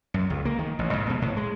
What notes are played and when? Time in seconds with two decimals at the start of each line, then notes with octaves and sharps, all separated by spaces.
0.14 F#2
0.30 C#2
0.45 A#3
0.59 D#3
0.79 A1
0.93 G#2
1.10 B2
1.22 A2
1.37 G#3